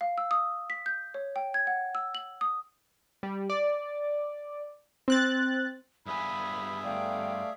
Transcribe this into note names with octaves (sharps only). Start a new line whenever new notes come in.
F5
E6
D#6
B6
G6
C#5
G5
G#6
F#5
E6
F#7
D#6
G3
D5
C4 F#6 A6
G2 B3 G#4 E5 G#5 B5
A3 D5 F5 G5